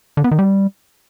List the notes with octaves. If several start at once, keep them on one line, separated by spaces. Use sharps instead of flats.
D3
B3
D#3
G3